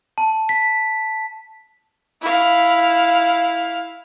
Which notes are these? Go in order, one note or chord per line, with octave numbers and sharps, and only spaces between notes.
A5
B6
E4 F5